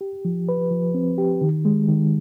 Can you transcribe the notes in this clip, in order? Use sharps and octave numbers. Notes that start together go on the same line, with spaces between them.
G4
F3
B4
F3
C4
G4
D#3
G#3
D#3